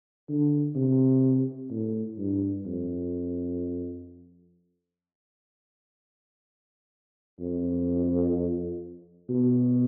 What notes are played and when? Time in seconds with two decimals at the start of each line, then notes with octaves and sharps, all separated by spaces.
0.29 D3
0.76 C3
1.71 A2
2.18 G2
2.66 F2
7.40 F2
9.29 B2